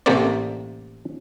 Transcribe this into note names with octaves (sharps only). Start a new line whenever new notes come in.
A1 C3 A3 A#3 C4 D5